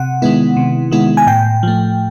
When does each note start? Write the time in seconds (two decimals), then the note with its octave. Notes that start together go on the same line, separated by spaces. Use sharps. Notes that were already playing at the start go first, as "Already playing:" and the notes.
Already playing: C3 F#5
0.22 D#3 G#3 B3 E4
0.57 C3
0.92 D#3 G#3 B3 E4
1.17 G#5
1.27 A2 G5
1.63 F3 A3